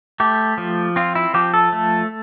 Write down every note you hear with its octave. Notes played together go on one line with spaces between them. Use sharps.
A3 G4
F3
C4 F4
E4
F3 G4
A4
A3